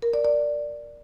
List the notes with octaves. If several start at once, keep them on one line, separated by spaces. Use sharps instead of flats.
A#4
D5
D5